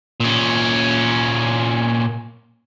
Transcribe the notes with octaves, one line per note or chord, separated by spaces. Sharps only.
A#2 C#4